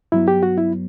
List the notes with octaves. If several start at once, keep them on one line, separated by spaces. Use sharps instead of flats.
G2 F#3 B3 E4
G4
F#4
E4